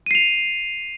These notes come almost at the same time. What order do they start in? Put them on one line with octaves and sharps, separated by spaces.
D#7 C7 F7